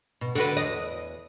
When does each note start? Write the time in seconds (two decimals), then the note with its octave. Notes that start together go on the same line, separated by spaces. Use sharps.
0.21 B2
0.35 D3 F#4 B4
0.57 E2 D#5